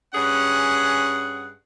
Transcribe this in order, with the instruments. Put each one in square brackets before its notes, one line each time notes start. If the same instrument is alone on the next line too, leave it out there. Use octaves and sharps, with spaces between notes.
[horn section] G2 C#4 G#4 F#5